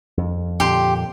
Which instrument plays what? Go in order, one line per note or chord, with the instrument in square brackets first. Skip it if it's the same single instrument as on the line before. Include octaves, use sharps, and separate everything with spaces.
[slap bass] F2
[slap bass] F2 A#2 D3 [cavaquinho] G4 G5 C6